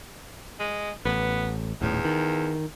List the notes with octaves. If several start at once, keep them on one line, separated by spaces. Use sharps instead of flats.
G#3
A1 B3
D#1 E2 A2
D#3